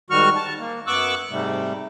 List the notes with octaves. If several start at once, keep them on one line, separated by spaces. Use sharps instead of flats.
G#2 D#3 G3 F#4 C#6 F6
A5
A#3
F#2 B3 C#6 D6 E6 F#6
G#2 C3 G3 A3